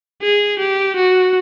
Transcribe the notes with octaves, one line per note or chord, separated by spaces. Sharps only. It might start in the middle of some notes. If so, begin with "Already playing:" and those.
G#4
G4
F#4